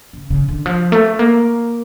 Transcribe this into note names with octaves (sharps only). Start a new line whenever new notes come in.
C#3
C#3
D3
F3
A3
A#3